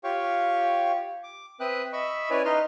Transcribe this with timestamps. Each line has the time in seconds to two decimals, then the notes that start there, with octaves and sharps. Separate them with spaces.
0.04 F4 G4 C#5 F5 G5 C#6
1.23 D6
1.60 C4 B4 E5 G5 D#6 F#6
1.93 D#5 E5 B5 C#6 E6
2.30 C#4 E4 B4 C#5 D5 G#5
2.45 D#4 B4 D#5 C6 F6